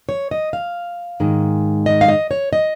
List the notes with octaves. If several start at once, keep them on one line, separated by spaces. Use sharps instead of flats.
C#5
D#5
F5
G#2 D#3 G#3
D#5
F5
D#5
C#5
D#5